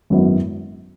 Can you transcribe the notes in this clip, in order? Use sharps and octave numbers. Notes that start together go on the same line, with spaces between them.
G#1 F#2 F#3 B3 E4